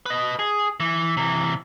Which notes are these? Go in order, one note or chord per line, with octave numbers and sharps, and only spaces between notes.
B4 D#5
G#4
E3
C3 E3